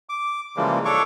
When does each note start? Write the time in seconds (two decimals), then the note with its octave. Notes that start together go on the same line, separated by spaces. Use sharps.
0.09 D6
0.57 C#3 E3 F3 G3 G#3 A#3
0.85 D4 A4 C#5 C#6 D6